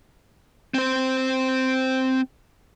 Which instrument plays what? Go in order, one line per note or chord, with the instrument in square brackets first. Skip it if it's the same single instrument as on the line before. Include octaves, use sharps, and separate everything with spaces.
[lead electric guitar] C4 C5